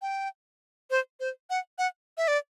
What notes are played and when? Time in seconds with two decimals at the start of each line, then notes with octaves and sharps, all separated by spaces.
0.02 G5
0.91 C5
1.20 C5
1.50 F#5
1.78 F#5
2.17 E5
2.28 D5